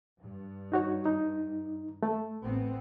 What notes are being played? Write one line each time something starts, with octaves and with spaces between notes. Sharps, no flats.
G2
D#4 F#4 C#5
D#4
A3
A1 B3 C4